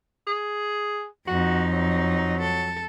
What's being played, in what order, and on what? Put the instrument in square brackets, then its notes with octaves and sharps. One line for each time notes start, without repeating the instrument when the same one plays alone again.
[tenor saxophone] G#4
[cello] F2 D#4 [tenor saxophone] F#4
[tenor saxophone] F#3
[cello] A4